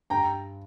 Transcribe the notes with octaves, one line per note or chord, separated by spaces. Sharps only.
G2 G5 A#5